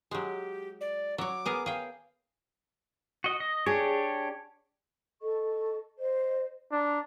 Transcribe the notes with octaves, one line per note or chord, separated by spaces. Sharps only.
F#3 G#3 G4
D5
F#3 C#5 D6
B3 G#4 A#4
G#4 F5 G5
F#4 D#5
D#5
D4 G4 G#4 C#5
A4 D#5 C#6
C5 D#5
D4 A#5